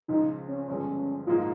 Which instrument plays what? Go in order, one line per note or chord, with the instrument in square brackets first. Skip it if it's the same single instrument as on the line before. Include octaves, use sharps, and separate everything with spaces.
[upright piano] C#2 C#3 F3 [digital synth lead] D#4
[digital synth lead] C#4
[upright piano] G1 G2 F3 G#3 [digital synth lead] C#4
[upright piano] A#1 G#2 F3 A#3 D#4 [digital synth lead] F4